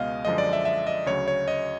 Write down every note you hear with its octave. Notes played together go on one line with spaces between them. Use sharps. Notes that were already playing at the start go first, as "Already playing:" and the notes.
Already playing: C#2 B2 G#3 B3 D#5 F5
F#2 D3 F3 G#3 D#5
D5
E5
E5
D#5
D2 C#3 F#3 C#5
C#5
D#5